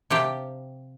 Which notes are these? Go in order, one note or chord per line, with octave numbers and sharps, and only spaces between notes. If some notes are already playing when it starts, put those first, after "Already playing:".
C3 F3 G4